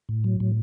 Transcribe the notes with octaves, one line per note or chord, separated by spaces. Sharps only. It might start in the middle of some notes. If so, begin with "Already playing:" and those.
A2
F#3
A2